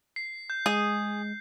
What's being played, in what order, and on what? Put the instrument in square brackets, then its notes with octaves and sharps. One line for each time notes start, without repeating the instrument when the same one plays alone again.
[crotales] C7
G6
[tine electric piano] G#3 [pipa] G#4